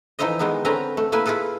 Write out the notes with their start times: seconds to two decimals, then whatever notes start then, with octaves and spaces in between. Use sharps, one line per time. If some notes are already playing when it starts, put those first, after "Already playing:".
0.19 E3 F3 D#4 E4 C5 D#5
0.39 D#3 E3 G#3 B3 D#4
0.65 D3 C4 C#4 B4 G#5 A#5
0.97 A3
1.12 A3 A#3 E4 B4 G#5
1.26 E4 F4 G#4 A4 B4